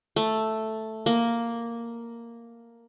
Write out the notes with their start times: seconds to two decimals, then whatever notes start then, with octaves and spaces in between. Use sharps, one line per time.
0.16 A3
1.06 A#3